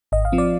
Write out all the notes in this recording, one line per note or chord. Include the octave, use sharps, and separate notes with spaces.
G#1 D#5
F5
F3 C4
D5